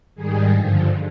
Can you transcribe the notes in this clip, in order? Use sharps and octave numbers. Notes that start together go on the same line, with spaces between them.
G#2 D#3 G3 G#4
G2 D3 F3